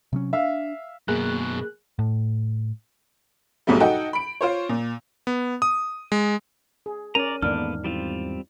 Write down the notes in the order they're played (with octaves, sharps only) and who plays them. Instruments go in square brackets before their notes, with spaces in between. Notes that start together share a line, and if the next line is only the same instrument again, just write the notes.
[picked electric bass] C3 F#3 C#4
[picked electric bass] D4 [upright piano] E5 F5
[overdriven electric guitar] F#2 B2 [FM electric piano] A#3 G#4 F#6
[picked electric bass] A2
[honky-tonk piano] B1 G#2 B2 F#3 G3 A3
D#4 F#4 A4 D#5 G5
B5 D7
F4 C5 C#5
A#2
[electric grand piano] B3
D#6
G#3
[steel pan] G#4
[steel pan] C#4 A#4 [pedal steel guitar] D5 A#5 [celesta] D#7
[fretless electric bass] E2 G#2 D#3 [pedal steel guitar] A#3 B3 A4 [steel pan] D4 [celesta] F6
[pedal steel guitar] G3 C4 F4 [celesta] E4